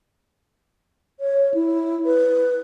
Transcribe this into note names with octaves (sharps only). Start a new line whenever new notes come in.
C#5
E4
B4